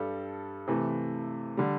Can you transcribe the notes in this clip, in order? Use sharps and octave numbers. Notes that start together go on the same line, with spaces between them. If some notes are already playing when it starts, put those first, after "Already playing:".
Already playing: G2 G3 A4
C3 E3 A3
D3 G3